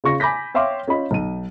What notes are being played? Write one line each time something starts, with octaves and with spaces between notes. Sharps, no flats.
C#3 F4 C#6 A#6
G#5 B5 D6 G6 A#6 B6
C#5 E5 F5 G5 C6 D6
C#4 F4 D#5 B5
B1 D#7